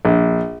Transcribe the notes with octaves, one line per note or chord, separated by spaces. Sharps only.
A#1